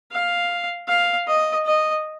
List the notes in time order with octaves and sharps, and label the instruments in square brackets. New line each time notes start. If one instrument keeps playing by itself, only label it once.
[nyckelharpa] F5
F5
D#5
D#5